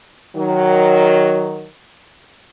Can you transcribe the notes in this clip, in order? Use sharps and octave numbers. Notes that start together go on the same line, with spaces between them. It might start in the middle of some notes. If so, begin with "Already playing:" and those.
D#3 F#3